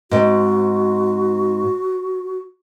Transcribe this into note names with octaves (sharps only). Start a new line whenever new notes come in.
G#2 C4 F#4